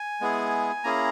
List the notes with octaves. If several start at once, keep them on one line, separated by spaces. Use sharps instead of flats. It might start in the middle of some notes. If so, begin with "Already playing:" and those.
Already playing: G#5
G#3 B3 E4 G#4
A#3 C#4 E4 G#4 A#5